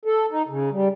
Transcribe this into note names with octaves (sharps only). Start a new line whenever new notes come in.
A4
D#4
C#3
G3